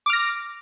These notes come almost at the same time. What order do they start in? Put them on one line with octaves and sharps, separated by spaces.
D6 F6 A#6